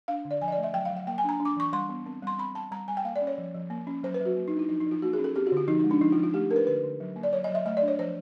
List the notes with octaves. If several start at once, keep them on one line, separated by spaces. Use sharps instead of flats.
D4 F5
D3
D5
F3 G#5
D#5
D5
A3
E5
F#3 G5
F5
F#3
F#5
A#3 G5
G#5
D4 A#5
D4
D6
E3 C#6
G3 C6
B3
C4
G3 C6
C4 B5
G3 A5
G3 A#5
G3 G#5
G5
A#3 F5
D5
C#4
C#5
F3
F3
A#3
C#4
F#3 C5
B4
F#3 F#4
A#3
D#4
D4
E4
F3 D#4
D#4
F3
F4
A#3 F#4
G#4
C#4
A4
C4 G4
F#4
D3
F4
F3 D#4
G#3 D#4
D4
F3 D#4
F4
F3
F4
A3 G4
D4 A#4
B4
D3 B4
D3
F#3
A#3
D5
F#3 C#5
D#5
F#3
E5
A3 D#5
D5
D4
C#5
F3 C5